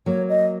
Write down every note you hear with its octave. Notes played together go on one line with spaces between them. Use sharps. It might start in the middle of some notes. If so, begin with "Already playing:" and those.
F#3 A#3 C#5
D#5